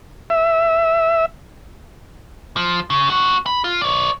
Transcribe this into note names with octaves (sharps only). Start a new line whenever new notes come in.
E5
F3
C#3
F2 F#4
B5
F4
C#5 D5